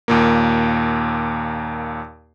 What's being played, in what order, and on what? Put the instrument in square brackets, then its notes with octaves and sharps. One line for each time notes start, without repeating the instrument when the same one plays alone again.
[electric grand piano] D#2 A#2 A#3